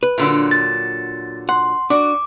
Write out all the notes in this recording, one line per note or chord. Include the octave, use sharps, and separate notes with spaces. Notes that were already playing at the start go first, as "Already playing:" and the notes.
B4
A#2 D3 F#3
A6
F#5 C6
D4 F#4 D6